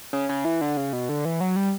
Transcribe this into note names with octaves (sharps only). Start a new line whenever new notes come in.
C#3
C#3
E3
D3
C#3
B2
D3
E3
F#3
G3